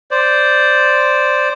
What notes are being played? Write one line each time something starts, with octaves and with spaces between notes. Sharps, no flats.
C5 D5